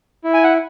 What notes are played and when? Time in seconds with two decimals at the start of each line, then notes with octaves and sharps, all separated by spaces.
0.24 E4
0.34 G#5
0.44 F#5